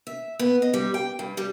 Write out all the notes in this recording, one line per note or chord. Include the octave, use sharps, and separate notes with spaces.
E5
B3
D#5
G3
G5
G2
G3